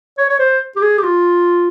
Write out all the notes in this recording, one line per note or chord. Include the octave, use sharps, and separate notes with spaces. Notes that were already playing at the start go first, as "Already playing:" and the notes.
C#5
C#5
C5
G4
G#4
G4
F4